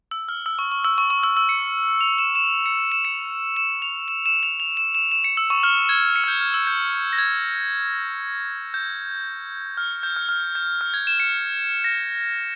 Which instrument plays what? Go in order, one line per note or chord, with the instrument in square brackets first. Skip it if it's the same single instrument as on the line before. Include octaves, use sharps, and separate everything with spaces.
[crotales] E6
F6
E6
C#6
C#6
E6
C#6
C#6
E6
E6
C#7
F7
E7
E7
C#7
E7
C#7
E7
F7
E7
E7
F7
F7
E7
E7
E7
C#7
E6
C#6
F6
G#6
C#7
F6
G6
F6
E6
G6
A#6
G#6
G6
F6
G6
F6
F6
G6
F6
G#6
E7
C#7
A#6